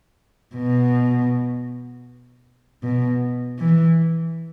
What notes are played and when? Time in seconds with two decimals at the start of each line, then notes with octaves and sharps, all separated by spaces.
0.56 B2
2.83 B2
3.59 E3